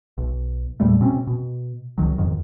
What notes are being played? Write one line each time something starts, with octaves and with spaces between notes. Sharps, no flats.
B1
E2 A#2 G3 A3
B2 C4 C#4
B2
C#2 D#3 F#3
F2 G#2 D#3